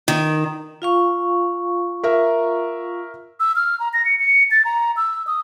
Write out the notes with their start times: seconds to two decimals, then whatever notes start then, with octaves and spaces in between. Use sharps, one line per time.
0.08 D#3
0.82 F4 F5 C#6
2.04 A#4 E5 A#5
3.40 E6
3.56 F6
3.80 A#5
3.93 A#6
4.05 C#7
4.19 C#7
4.51 A6
4.65 A#5
4.97 E6
5.27 D#6